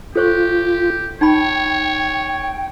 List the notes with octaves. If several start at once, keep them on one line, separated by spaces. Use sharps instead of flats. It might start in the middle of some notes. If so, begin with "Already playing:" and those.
F4 G4 A4 C5 C#6
D#4 C#5 G5 B5